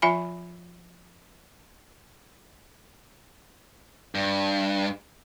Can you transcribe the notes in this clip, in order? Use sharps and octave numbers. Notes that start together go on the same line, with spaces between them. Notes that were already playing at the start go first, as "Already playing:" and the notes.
F3 F4 E5 G#5 B5
G2